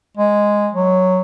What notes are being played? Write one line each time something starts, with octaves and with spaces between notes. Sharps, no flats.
G#3
F#3